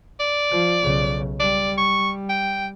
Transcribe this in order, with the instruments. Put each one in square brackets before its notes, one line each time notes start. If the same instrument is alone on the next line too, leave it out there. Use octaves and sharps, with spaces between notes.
[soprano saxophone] D5
[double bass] F3
B1 C#3
[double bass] G3 [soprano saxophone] D5
[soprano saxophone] C#6
G5